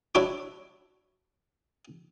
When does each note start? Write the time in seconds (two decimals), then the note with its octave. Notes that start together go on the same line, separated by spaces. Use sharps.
0.15 D4 E4 F#4 C#5 D6